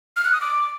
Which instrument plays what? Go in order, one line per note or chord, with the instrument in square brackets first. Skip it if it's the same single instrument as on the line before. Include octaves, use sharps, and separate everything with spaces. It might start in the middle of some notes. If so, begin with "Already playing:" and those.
[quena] F6
F#6
D#6
D6